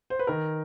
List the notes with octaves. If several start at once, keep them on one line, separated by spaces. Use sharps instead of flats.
C5
B4
D#3 A#4